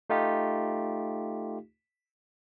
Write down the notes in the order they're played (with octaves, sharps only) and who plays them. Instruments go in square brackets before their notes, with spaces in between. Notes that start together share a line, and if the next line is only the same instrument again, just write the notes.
[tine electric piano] A3 D#4 F4 G4